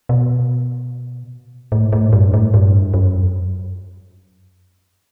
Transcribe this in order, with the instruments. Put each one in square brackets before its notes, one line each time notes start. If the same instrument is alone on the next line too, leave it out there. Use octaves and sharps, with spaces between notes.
[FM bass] B2
A2
A2
G2
A2
G2
F#2